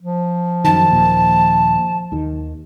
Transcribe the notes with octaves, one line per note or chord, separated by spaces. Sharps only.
F3
F#2 D#3 A5
D#2 A#2
D#2 D#3